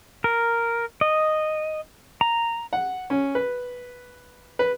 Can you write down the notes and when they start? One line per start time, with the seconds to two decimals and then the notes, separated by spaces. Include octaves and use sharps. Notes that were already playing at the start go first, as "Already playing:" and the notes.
0.24 A#4
1.01 D#5
2.21 A#5
2.73 F#5
3.10 C#4
3.35 B4
4.59 B4